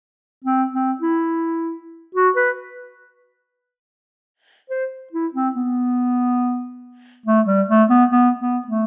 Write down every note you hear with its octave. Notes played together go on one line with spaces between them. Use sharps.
C4
C4
E4
F#4
B4
C5
E4
C4
B3
A3
G3
A3
B3
B3
B3
A3